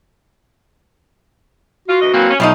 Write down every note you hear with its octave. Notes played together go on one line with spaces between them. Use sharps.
F4 F#4
D2 E3 D#5
E3 F#3 A#3 C4
C#4
B1 F3 G3 A3 D#4